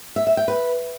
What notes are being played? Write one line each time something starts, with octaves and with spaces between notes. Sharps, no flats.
E5
E5
G5
B4